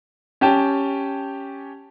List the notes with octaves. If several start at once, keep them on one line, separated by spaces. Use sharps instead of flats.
C#4 G4 G5 A5